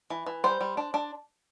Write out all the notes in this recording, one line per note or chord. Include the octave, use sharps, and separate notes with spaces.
E3
E3
G3 C5
G3
D4
D4